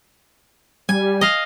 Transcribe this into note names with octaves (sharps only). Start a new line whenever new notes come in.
G3 G#5
D#5 F5